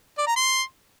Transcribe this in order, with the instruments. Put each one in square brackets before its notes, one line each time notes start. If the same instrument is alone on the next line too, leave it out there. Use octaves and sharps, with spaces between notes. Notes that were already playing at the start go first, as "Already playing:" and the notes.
[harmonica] D5
A#5
C6